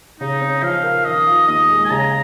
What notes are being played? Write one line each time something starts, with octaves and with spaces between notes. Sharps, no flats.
C#3 D#4
C#4
F3 F5
A#4
D#3 D#5
F4
D#2 D#5
G#3
G#5
C#3 A#5